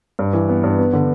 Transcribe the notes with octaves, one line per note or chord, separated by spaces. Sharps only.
G2
E3
B3
G2
B3
D3